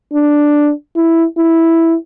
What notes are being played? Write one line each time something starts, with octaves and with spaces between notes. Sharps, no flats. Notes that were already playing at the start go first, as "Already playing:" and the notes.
D4
E4
E4